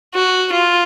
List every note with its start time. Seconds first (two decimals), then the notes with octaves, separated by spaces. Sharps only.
0.14 F#4
0.53 F4